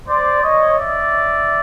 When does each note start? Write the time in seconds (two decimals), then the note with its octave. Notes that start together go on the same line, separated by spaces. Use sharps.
0.08 C5 D5
0.43 C#5 D#5
0.77 D5 E5